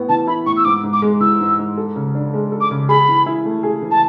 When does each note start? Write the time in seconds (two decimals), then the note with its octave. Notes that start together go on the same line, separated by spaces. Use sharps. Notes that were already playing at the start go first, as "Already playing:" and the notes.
Already playing: A2 B3 E4
0.09 E3 A5
0.27 E4 B5
0.46 A2 C#6
0.57 E6
0.65 G#2 D6
0.84 G#2
0.93 D6
1.02 G#3
1.20 E3 E6
1.40 G#2
1.59 G#2
1.77 A4
1.96 C#3
2.15 D4
2.34 G#3
2.52 A4
2.61 D6
2.71 C#3
2.89 G#4 B5
3.08 E3
3.26 E4
3.45 A3
3.63 G#4
3.82 E3
3.91 A5